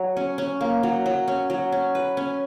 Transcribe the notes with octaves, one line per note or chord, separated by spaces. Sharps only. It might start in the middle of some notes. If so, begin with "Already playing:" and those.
Already playing: F#3
C#4
C#4
A#3
F#3
F#3
C#4
F#3
C#4
B4
C#4